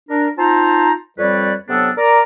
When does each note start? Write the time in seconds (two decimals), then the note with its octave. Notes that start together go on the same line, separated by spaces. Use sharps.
0.09 D4 A#4
0.37 C4 D#4 F4 C5 A5 A#5
1.18 F2 G3 C4 B4 C#5 D5
1.68 C3 F#3 B3 D4 A4
1.97 A#4 D5 A#5